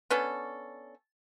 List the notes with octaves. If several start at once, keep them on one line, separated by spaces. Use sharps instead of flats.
B3 C#4 D4 A4